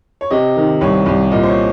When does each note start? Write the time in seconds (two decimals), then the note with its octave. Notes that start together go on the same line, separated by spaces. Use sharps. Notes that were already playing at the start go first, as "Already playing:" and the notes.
0.21 C#5
0.31 C3 D#5
0.56 D#3
0.81 C2 C#5
1.06 C2
1.31 A#2 D#5
1.43 C5
1.48 C#5